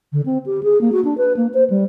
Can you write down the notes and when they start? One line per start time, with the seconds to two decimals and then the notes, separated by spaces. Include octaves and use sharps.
0.13 D3
0.26 C4
0.46 G4
0.63 G#4
0.81 A#3
0.92 F#4
1.04 D4
1.18 B4
1.37 A#3
1.54 C5
1.70 G3